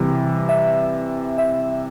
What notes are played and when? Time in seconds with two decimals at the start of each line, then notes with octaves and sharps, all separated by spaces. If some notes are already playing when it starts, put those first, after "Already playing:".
Already playing: C3 E3 G3
0.49 E5
1.38 E5